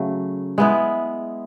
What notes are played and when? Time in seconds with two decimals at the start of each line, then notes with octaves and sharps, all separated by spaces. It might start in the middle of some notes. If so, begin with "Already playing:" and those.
Already playing: C#3 F#3 A3
0.58 G#3 B3 E4